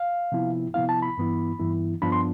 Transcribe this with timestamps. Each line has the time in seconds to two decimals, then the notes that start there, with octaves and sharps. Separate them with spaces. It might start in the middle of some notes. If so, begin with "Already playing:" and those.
Already playing: F5
0.32 C3 F3 B3 E4
0.74 C3 F3 B3 E4 F5
0.89 A5
1.02 B5
1.17 G2 E3 B3 E4
1.59 G2 E3 B3 E4
2.02 G2 F3 B3 D4 B5
2.12 C6